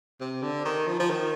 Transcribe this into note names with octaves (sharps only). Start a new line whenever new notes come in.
C3
D3
D#3
F3
F3
D#3